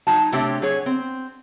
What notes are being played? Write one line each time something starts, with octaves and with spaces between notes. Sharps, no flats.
F#3 D#4 F#4 A5
C3 A3 C4 D4 G4 C#5
F#3 G#4 C#5
C4